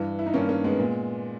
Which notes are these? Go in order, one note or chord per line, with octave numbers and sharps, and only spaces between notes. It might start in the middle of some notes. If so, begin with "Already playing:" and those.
Already playing: G2 E3
E4
D#4
G2 D#3 A#3 C#4
A#3 C#4
G#3 B3
A#2